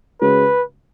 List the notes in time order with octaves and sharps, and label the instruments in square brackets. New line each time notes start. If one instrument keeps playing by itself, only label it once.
[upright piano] C#3 G#3 C#4 F#4 [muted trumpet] B4